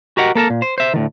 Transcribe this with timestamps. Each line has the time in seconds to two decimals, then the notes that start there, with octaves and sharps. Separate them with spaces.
0.17 F#4 G4 A#4 D#5 F#5
0.35 A#3 A4 A#4 A5
0.50 A#2
0.62 C5
0.78 C5 E5
0.94 D2 A2 D#3